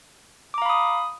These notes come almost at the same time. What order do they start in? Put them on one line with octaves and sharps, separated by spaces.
D6 A#5 F5 B5 D#6